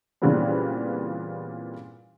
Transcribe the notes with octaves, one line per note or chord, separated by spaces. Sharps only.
A#2 C#3 E3 G3 B3 C4